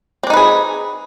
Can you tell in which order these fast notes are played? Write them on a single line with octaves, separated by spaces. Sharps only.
C4 D4 D#4 B4 G#4